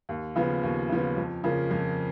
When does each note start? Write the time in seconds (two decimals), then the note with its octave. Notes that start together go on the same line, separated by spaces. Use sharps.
0.09 D#2
0.36 C#3 F3 B3
0.63 D#2
0.89 C#3 F3 B3
1.17 F2
1.44 C#3 F3 A#3
1.71 F2